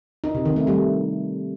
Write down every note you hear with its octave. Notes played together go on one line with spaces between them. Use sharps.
D#4
C3
D#3
A3
G3